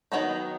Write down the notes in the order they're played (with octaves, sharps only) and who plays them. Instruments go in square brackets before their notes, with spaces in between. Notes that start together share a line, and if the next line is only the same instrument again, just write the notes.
[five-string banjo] D#3 F#3 B3 D#4